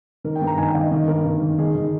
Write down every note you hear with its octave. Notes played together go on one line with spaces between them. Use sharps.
D#3 A#4
G5
G2
A#5
D#3 G#5
G5
D#3 F5
D#5
D#3
G2 A#4
D#3
D#3
D#3 G#4
D#3